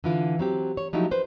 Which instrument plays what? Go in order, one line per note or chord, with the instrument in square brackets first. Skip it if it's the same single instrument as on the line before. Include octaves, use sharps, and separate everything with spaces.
[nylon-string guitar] D3 E3 F4
F#3 C4 G4
C#5
F3 F#3 A3 D#4 E4 G4
B4 C5